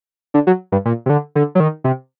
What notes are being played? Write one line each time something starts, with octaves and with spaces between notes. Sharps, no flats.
D3
F#3
G2
A#2
C3
D3
D3
F#3
D#3
C3